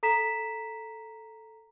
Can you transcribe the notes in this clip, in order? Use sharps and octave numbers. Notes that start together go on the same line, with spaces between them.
A4 A#5 B6 E7